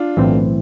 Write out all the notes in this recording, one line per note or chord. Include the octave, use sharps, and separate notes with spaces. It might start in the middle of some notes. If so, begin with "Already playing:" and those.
Already playing: D4 F4
B1 A2 E3 A3 C4